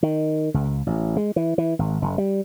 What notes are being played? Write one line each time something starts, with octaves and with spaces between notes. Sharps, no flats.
D#3
C#2
A1
G#3
E3
E3
G#1
F#1
G3